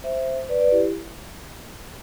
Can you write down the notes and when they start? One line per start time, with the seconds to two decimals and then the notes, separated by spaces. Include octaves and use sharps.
0.04 C5 E5
0.49 B4 D5
0.60 B4 D5
0.71 E4 G4